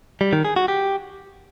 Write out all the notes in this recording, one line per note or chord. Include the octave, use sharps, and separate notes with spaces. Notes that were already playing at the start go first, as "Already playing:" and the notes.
G3
D#3
G#4
F#4
G4